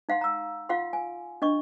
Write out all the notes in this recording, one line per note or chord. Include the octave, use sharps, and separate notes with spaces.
D#4 F5 F#5 C6
A#5 E6
F4 F5 F#5 C6
G#5
D4 D#5 C#6